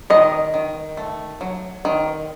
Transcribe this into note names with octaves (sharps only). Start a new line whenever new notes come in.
D#3 D#5
D#3
A3
F#3
D#3